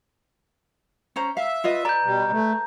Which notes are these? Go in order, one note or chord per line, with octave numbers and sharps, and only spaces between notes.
C#4 C5 A#5
E5 F5
F4 B4 D#5
B4 D5 A#5 G6
B2 G3
A3